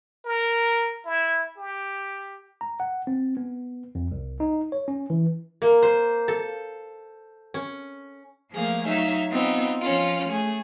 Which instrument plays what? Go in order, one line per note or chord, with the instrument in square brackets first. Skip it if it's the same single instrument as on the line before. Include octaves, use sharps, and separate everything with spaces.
[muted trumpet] A#4
E4
G4
[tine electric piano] A#5
F#5
C4
B3
F2
C2
D#4
C#5
C#4
E3
[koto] A#3
C5
A4
C#4
[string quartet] F3 A3 A#3 G#4 F5
F#3 D#4 E5 F5
B3 C4 D#4 F4
F3 C#4 F4
A3 G#4